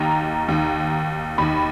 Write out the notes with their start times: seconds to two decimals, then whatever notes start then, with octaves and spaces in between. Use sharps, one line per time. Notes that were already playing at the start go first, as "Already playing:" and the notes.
Already playing: D#2 D#3 A#5
0.48 D#2 D#3
1.38 D#2 D#3 B5